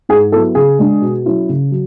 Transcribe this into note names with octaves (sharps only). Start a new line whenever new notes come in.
G#2 G#4
F#3 B3 E4 A4
C#3 G#4
G#3 D4
B2
F#3 C#4 E4
C#3
F#3